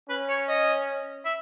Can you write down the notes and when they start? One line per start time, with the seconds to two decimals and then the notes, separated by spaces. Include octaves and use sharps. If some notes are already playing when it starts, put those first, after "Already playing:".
0.09 C#4 B4
0.29 C#5
0.48 D#5
1.25 E5